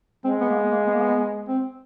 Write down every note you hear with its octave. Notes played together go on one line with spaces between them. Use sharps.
G#3 C4
B3
A#3
B3
A#3
B3
A#3
B3
C4